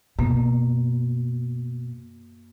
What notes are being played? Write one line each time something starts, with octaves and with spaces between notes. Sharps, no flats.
F#2 B2 A#3